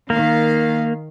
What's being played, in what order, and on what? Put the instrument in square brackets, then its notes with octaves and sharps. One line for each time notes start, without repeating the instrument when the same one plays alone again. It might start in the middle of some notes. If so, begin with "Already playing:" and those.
[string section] D#3 F5 [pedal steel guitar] A#3